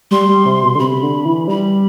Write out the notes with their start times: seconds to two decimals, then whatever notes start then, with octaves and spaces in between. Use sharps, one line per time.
0.11 G3 C6
0.28 G3
0.46 C3
0.63 B2
0.75 D3
0.79 C3 B5
1.03 D3
1.25 E3
1.48 G3 B5